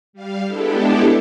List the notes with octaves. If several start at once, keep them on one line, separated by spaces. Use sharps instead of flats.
G3 F5
G#3 B3 D4 E4 G4 A4